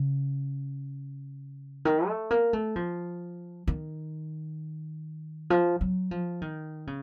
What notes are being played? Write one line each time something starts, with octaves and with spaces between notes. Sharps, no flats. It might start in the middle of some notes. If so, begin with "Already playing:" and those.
Already playing: C#3
D#3
A3
A#3
A3
F3
D#3
F3
F#3
F3
D#3
C#3